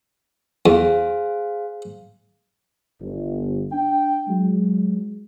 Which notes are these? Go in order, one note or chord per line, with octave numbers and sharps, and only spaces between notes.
E2 G#4 C5 F5
G1
D4 G5
F#3 G#3